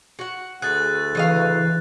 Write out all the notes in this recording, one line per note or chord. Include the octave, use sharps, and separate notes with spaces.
F#4 F#5
D2 G#4 F#6 A6
C#3 E3 D#5 F5